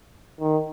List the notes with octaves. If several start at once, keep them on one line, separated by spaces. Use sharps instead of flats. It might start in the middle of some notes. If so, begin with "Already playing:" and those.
D#3